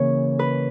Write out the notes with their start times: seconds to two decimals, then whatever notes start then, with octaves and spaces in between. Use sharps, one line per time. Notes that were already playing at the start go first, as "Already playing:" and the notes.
Already playing: C#3 E3 A#3 C#5
0.39 B4